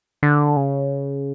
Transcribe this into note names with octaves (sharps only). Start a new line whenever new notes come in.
D3
C#3